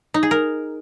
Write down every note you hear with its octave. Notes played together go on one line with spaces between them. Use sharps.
D#4
G#4
A#4